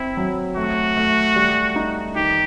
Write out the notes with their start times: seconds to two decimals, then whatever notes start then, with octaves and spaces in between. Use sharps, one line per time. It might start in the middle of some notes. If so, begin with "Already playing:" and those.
Already playing: C4 E4
0.17 F#3
0.57 A3 F#4
0.97 A3
1.36 G3
1.76 D#4
2.16 D#3 G4